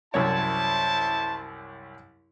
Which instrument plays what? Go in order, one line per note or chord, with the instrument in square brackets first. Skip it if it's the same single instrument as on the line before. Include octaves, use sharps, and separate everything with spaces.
[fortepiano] C2 F#2 C#5 [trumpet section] E4 C5 A5